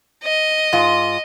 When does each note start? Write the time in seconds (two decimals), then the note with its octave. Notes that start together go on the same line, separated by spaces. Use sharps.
0.24 D#5
0.73 G#2 F4